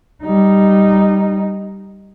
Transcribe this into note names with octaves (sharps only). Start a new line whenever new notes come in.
G3 D#4